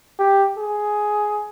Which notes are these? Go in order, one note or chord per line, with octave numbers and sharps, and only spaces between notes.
G4
G#4